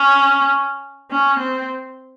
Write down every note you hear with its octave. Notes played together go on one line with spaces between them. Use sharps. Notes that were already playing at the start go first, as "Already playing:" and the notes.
Already playing: C#4
C#4
C4